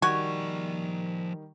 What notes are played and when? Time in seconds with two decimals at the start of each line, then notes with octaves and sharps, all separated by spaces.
0.02 D#3 F3 G3 F#4 D5 G#5 C#6